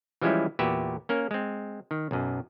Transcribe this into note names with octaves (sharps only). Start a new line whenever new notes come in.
E3 F3 G3 G#3 C#4 E4
E2 A#2 F#4 G4 B4 E5
A#3 C#4 A#4
G#3 C4
D#3
B1 F#2